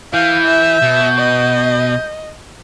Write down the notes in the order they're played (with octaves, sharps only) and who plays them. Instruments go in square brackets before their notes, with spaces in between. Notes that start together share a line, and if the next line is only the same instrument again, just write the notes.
[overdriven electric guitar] E3 [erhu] F5 [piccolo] G6
[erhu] E5
[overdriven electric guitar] B2
[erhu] D#5